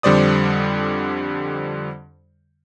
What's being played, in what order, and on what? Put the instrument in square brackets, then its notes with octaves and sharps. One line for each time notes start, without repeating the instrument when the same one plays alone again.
[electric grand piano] F2 D3 G3 C5 D5 D#6